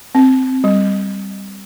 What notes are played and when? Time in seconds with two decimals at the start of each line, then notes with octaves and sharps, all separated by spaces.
0.15 C4
0.64 G3